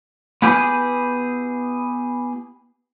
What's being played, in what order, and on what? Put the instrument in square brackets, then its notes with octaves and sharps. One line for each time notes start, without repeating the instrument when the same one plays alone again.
[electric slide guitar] B3 E4 G4 G#4 B4 G#5